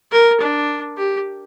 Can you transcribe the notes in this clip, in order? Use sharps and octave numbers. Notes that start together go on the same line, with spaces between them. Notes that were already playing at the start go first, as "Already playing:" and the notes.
A#4
D4
G4